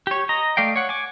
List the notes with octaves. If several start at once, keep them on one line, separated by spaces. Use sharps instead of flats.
G4 C#5
D#5 A#5
A3 D5 F5 G5
C#5 F#5
G#5 D6